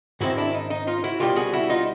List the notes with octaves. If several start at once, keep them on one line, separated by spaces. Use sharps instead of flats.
G#2 D#3 G#3 C4 E4 F#4
D4 E4
D#4
D#4
D#4 F4
E4 F#4
C2 B2 G3 F4 G4
F#4 G#4
E4 F#4
D#4 F4